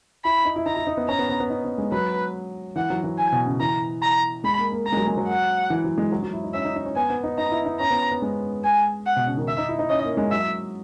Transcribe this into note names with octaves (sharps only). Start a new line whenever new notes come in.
E4 B5
D#4
E4
D#4 A#5
E4
D#4
B3
C#4 A#5
B3
B3
B3
D#4
B3
G#3
F#3 B4
E3 F#5
F#3
E3
G#5
B2
C#3
E3 A#5
A#5
G#3 B5
A#3
A#3
A#3 A#5
G#3
F#3
G#3
F#3
F#5
E3
F#3
G#3
F#3
F#3
E4
D#4
C#4 E5
D#4
D#4
C#4
B3 G#5
B3
D#4
D#4 A#5
E4
D#4
C#4 A#5
B3
B3
G#3
G#5
F#5
B2
C#3
D#3
E5
D#4
E4
D#4
C#4 D#5
A#3
G#3
F#3 E5